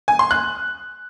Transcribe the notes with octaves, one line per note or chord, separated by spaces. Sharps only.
G#5
C6
F#6